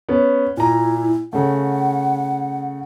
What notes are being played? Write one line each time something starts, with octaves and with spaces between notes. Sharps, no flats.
B3 C#4
A#2 E4 A#5
C#3 A3 F#5